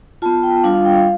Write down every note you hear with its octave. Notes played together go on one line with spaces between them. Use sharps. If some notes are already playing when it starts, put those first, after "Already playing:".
B3 F4 A5
G5
G3 D4 F4 F5
F5
G5
F5